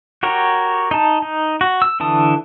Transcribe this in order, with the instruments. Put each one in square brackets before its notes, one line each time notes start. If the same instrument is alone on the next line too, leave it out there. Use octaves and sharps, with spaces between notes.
[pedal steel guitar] F#4 G4 A#4 C#5
D#4 A5
D#4
F#4
E6
D3 E3 A5 D#6